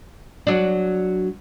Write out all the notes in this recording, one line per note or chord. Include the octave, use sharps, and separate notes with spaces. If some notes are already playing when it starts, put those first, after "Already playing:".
F#3 D4